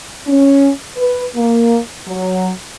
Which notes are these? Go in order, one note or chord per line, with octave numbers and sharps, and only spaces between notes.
C#4
B4
A#3
F#3